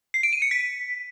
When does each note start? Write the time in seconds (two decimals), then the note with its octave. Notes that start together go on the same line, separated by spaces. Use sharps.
0.14 C7
0.23 D7
0.33 D#7
0.42 C#7
0.51 B6